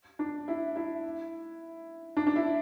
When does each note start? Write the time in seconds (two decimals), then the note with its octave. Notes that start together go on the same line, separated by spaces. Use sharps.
0.19 D4
0.48 E4
0.76 E4
2.17 D4
2.27 D4
2.36 E4